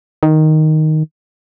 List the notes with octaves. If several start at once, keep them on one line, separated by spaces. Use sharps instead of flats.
D#3